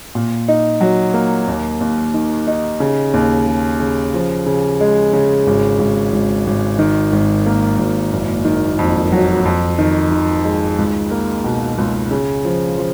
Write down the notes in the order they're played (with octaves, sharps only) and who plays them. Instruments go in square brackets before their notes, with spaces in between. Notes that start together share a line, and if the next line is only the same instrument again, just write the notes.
[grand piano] A#2
D#4
F#3
A#3
D#2
D#2
D#3
D#4
C#3
D#2
C#3
C#3
F3
C#3
G#3
C#3
G#1
G#1
G#1
G#1
D#3
G#1
A#3
G#1
F#1
D#3
F2
F#3
F2
D#3
D#3
G#3
C#2
A#3
B2
C#2
C#3
F3
F3